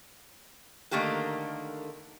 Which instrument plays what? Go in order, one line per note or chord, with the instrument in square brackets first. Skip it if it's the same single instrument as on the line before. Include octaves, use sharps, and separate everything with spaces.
[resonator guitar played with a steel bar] D3 D#3 A3 A#3 G4 A#4